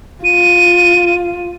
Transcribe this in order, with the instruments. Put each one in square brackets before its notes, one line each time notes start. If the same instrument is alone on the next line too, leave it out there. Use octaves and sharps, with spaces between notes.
[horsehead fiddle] F4 [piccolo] D#7